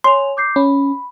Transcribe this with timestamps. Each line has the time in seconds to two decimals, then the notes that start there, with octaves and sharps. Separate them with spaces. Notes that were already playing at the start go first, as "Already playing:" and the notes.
0.04 C#5 G#5 C6 F7
0.37 D6 G6 C7
0.56 C#4 B5